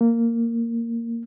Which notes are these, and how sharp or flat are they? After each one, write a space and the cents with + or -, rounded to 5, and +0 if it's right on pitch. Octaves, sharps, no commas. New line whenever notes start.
A#3 -10